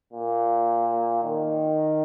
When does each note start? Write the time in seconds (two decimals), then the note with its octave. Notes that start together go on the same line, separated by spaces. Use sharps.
0.13 A#2
1.23 D#3